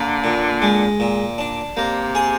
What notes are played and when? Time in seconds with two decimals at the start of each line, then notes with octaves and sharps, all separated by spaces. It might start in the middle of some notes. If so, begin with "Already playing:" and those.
Already playing: D3 A#3
0.24 A#2
0.62 G#3
1.00 A#2
1.38 D4
1.77 C3 A#3
2.15 G#4